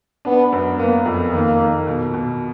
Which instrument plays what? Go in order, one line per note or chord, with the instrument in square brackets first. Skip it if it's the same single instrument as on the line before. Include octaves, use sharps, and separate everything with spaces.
[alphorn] B3 [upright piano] D4
[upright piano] F#2
[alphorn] A#3 [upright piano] B3
[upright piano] F2
[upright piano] D#3 [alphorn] A#3
[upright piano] D#3
B2
B2